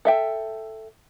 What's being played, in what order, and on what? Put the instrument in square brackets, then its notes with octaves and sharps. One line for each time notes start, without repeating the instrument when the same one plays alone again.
[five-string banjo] A4 E5 G5